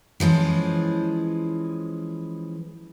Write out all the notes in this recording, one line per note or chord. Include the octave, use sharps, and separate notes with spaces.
E3 F3 G#3 C#4